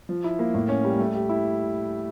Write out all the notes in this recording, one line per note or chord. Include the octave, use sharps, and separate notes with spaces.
F3
E4
A#3
A2
C#4
G3
A3
G4
E4